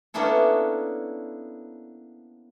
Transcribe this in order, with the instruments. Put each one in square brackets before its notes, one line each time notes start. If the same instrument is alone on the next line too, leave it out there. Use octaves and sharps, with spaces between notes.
[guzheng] A#3 B3 C#4 D4 E4 A4